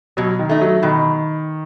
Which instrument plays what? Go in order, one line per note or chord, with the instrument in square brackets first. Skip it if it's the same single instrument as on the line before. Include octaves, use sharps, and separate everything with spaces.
[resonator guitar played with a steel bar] B2 [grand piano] F#3
[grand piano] D#3
[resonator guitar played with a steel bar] A3 D#4
[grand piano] F#3
[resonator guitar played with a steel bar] B2 [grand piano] D#3